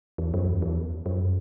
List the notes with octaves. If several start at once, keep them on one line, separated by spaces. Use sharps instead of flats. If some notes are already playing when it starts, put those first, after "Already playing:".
E2
F#2
E2
E2
F#2